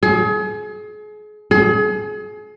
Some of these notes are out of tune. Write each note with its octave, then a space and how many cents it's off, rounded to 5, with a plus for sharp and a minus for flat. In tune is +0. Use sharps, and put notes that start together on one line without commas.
G#4 +35
G#4 +35